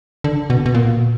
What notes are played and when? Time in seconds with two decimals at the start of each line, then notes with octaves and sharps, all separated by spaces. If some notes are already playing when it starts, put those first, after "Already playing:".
0.24 D3
0.50 B2
0.66 B2
0.75 A#2